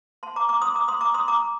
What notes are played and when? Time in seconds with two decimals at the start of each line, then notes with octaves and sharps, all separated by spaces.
0.23 A5 C6
0.36 A#5 D6
0.49 A#5 D6
0.62 C6 D#6
0.75 A#5 D6
0.88 C6 D#6
1.01 A#5 D6
1.14 C6 D#6
1.28 A#5 D6